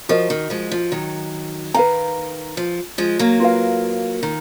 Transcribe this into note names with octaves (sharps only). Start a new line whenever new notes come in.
F3 F#4 A#4 D#5
D#3
F3 G#3
F3
D#3 F#3
D#3 B4 F5 A#5
F3
F3 G#3
F#3 A#3
F4 B4 F5
D#3